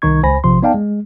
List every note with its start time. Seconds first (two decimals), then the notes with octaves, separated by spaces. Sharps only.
0.02 C2 D#3 D#4 C#6 G#6
0.23 C#2 C5 G#5 B5 A#6
0.44 A#1 C3 F3 C6
0.62 B3 D#4 D5 F5 G5 A5
0.74 G#3